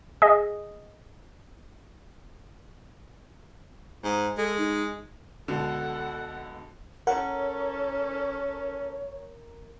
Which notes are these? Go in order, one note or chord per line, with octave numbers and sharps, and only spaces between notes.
G#4 D#5
G#2
G#3 A4
D#4
C#2 B2 D3 A4 F#5
C#4 A4 A#4 C#5 F#5